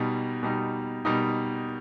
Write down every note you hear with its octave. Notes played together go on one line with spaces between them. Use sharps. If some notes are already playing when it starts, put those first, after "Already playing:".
Already playing: B2 G3 D#4
B2 G3 D#4
B2 G3 D#4